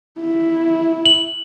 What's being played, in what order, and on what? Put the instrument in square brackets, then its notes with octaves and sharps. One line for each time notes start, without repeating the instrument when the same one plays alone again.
[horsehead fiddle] E4
[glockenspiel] F#7